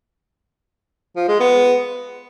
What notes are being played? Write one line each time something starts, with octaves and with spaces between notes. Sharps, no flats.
F3
G#3
B3